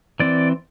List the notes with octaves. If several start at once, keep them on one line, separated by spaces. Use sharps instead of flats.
E3 C4 D5